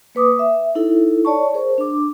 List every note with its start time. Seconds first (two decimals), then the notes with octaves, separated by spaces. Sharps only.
0.15 A#3 B4 D6 D#6
0.39 E5
0.75 D#4 E4 A4
1.25 C#5 D5 A5 C#6
1.54 G#4 A#4 C5
1.78 D4 D6